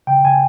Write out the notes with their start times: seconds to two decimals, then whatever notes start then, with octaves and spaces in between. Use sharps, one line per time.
0.07 C#3 G5
0.24 C#3 G#5